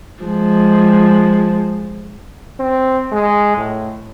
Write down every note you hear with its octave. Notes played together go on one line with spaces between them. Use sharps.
F3 G#3
C4
G#3
A2